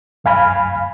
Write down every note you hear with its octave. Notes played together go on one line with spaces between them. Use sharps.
C2 F#2 F5 G#5 B5 F6